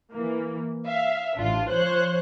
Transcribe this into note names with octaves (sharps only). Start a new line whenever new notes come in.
E3 A#3
E5 F5
A1 D4 F4
F3 C5 C#5 F#6